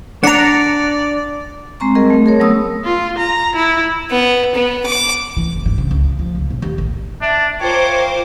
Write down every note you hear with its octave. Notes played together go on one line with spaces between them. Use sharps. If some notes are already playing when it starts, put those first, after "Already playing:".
D4 D5 F#5 A#5
G#3 C4 A#5 C#6
G3 C4 G#4 A#4 D#5
A3
G#4 A#4 C#5
F#3 A3 B3 C#4 D#6 E6
F4
A#5
E4
B3
B3
D6
E3
F1
G#2
C#3
C#2
B3
F3
C#2
B1
D#2
A1
D4 E5
F4 A#4 C5 C#5 G5 D6